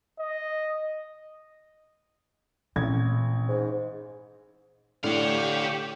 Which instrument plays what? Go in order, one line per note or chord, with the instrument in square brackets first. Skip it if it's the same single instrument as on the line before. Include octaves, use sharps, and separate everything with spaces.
[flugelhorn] D#5
[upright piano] A1 G#6 [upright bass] A#2 C4
[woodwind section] G#2
[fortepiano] A2 [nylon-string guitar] D3 [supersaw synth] G4 [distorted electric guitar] C#5 F5